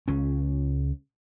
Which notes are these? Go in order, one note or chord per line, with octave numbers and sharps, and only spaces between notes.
C#2 C#4